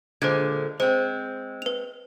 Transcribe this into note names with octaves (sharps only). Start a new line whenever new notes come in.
A#2 D3 G#3 C5 G#6
G#3 C4 C5
B4 F7